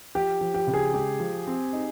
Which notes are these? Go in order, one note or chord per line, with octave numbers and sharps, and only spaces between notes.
F3 G4
F3
G4
C#3
G#4
G#3 G4
F3
C4
D#4